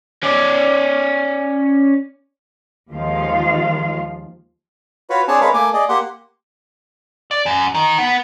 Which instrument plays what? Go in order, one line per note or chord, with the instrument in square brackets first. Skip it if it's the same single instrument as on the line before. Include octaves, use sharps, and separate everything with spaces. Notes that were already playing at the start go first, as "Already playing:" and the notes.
[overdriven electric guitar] C#4 D5
[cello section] D#2 D#3 F3 G#3 F4 F5
[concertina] F4 F#4 B4 C#5
C4 D4 G#4 C#5 G#5 A5
G#3 A#4 B4 C#5 F5
A3 A#3 G#5 D6
G#4 D5 D#5
A#3 G4 F#5 C6
[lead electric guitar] D5
F#2
D#3
B3